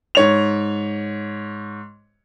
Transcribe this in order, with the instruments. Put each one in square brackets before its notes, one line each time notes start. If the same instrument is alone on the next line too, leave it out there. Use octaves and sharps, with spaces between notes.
[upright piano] G#2 C#5 F7